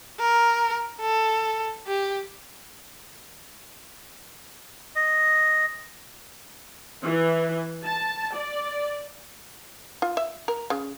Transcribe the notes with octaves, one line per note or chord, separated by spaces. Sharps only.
A#4
A4
G4
D#5
E3
A5
D5
F4
E5
A#4
C#3